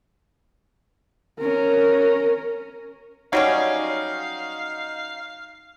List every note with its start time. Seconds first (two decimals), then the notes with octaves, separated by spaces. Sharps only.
1.39 C#4 A#4
3.33 F#3 G3 C#4 D#4 F5